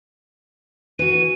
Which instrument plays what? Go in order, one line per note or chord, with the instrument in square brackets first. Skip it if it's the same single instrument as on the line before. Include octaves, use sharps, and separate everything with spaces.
[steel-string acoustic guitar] E3 F#4 [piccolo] D#7